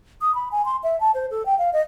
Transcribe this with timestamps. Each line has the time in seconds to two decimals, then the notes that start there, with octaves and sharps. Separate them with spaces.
0.21 D#6
0.35 B5
0.52 G#5
0.65 C6
0.83 E5
1.00 A5
1.14 C5
1.31 A4
1.46 G5
1.59 F5
1.73 D#5